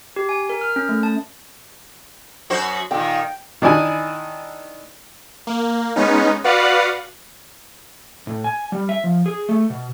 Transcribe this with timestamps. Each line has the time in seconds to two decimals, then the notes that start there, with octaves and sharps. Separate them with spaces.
0.16 G4
0.29 G#5
0.50 A#4
0.61 F6
0.76 C#4
0.89 A3
1.03 A5
2.50 F#2 F#4 C5
2.91 A#2 D#3 G5
3.62 D#3 D4 E4 G#5
5.47 A#3
5.96 G#3 B3 C#4 D#4
6.44 F#4 B4 D5 F5 F#5
8.27 A2
8.44 G#5
8.72 G3
8.89 E5
9.04 F3
9.26 G#4
9.49 A3
9.70 B2